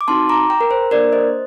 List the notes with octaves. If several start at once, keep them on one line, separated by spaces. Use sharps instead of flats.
D6
C4 D#4 F#4 A5 C6
A#5 D6
G5 A#5
A#4
C5
A#3 D4 A4 A#4 D5
C5 D#5